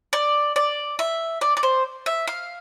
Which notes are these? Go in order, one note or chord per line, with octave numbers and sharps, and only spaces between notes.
D5
D5
E5
D5
D5
C5
E5
F5